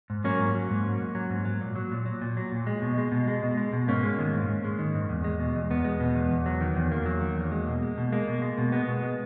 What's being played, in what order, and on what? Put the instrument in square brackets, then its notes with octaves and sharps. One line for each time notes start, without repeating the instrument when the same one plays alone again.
[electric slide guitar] G#2
F#3 A#3 C#4
G#2
F#3
G#2
F#3
G#2
F#3
G#2
F#3
A#2
F#3
A#2
F#3
A#2
F#3
A#2
G#3
B2
G#3
B2
G#3
B2
G#3
B2
G#2 A#3 C#4
G#3
D#3
G#2
G#2
G#3
D#3
G#2
E2
G#3
B2
E2
E2 B3
G#3
B2
E2
E2
F#3
D#3
E2
E2 A#3
F#3
D#3
E2
G#3
B2
G#3
B2
G#3 A#3
B2
G#3
B2
G#3 B3
B2
G#3